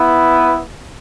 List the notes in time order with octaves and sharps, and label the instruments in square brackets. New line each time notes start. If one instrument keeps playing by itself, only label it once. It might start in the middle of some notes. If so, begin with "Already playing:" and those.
Already playing: [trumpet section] B3 E4 B4